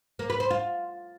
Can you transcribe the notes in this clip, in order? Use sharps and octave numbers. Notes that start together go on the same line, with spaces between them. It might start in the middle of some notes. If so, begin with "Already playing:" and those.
A#3
B4
C5
F4